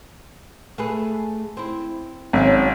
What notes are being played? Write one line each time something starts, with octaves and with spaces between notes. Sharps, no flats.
A3 G#4 B4
C4 E4
G#1 F#3 C#4